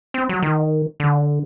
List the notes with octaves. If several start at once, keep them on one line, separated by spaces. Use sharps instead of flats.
C4
F#3
D#3
D3